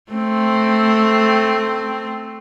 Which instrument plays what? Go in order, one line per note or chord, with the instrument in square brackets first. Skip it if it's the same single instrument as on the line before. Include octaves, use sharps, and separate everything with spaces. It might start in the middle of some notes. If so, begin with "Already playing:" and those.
[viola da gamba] A3 C4